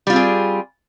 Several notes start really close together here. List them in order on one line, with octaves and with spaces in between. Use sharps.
G3 F4 C4 G#4